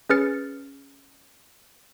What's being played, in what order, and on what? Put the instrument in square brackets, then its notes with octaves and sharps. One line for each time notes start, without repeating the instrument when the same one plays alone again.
[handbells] C#4 G#4 B4 F6 A6 C#7